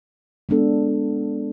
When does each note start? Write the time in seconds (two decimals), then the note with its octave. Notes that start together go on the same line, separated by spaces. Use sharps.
0.49 G#3 B3 D4 A4